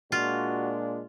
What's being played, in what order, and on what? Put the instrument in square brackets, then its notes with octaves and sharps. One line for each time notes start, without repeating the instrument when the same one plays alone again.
[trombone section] A#2 G#3 D4 [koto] F4 [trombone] F#4